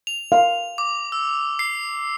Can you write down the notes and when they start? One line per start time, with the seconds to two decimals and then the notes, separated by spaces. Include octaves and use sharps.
0.07 F7
0.32 F5
0.78 D6
1.12 E6
1.59 C7